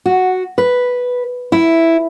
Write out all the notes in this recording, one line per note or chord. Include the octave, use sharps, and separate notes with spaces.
F#4
B4
E4